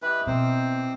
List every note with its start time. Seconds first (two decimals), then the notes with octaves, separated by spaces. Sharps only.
0.02 E3 G4 B4 D#5
0.27 B2 C4 A#4 C5